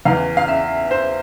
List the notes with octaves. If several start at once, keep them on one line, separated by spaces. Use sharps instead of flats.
E2 E3 F5
F5
E5
C5